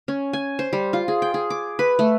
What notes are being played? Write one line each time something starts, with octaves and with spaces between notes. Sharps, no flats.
C#4
G#5
C5
G3
F4
G#4
G5
G#4
D6
B4
A3